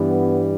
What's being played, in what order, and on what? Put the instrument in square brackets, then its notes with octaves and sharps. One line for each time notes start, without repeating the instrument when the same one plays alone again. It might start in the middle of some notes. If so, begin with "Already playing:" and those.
Already playing: [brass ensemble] G2 E3 G3 B3